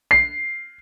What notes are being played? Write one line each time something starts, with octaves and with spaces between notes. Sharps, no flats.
C7